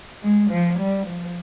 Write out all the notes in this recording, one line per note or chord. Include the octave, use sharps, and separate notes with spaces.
G#3
F3
G3
F3